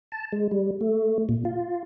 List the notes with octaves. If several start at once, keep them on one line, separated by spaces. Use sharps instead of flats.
A5
G#3
G3
A3
A#2
F4